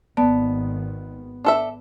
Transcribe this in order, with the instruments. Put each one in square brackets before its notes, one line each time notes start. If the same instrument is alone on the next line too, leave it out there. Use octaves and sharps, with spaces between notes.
[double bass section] G#1 D#3 [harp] B3 [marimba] D5 A5
[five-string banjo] D4 A4 E5